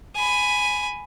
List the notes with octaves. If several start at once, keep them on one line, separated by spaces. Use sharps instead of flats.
G#5 B5